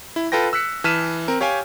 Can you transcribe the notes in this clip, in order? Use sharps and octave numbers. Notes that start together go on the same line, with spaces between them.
E4
F4 A4 B4 G5 A#6
E6 F#6 B6 C#7
E3 A5 F6 B6 D#7 E7
C4 A#4
G4 C#5 F5 G5 G#5